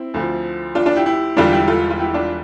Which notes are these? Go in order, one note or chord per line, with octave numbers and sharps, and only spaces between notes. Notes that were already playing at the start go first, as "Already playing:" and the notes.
Already playing: C4 E4
D2 D3 F3
D4 F4
D4 F4
E4 G4
E4 G4
E1 E2 D3 G3 D4 F4
E4 G4
F4 A4
F4
E4 G4
D4 F4